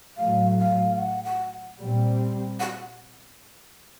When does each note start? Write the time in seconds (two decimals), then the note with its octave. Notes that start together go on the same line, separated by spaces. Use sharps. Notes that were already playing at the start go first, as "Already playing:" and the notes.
0.17 A2 F#3 A3 F5
0.59 F5
0.98 F#5
1.25 F#5
1.79 A#2 G3 C4
2.60 F#5